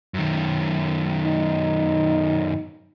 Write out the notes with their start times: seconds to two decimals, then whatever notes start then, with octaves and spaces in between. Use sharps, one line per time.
0.14 F#2 D#3
1.26 D#4